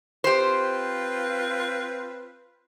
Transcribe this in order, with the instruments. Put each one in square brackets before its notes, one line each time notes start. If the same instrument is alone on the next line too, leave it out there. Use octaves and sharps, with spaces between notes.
[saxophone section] C4 F4 B4 [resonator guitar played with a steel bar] G4 C5